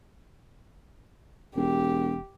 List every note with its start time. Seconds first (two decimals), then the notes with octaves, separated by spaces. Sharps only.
1.56 E1 G4